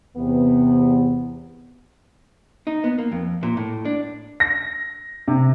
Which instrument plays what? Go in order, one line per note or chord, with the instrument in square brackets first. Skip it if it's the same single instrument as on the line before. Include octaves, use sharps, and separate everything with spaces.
[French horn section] E2 C3 B3
[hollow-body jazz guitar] D#4
B3
A#3
F2
A#2
A2
D4
[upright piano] A#6
C3